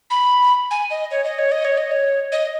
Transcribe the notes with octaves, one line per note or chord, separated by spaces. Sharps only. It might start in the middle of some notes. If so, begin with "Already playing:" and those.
B5
G#5
D#5
C#5
D#5
C#5
D#5
C#5
D#5
C#5
D#5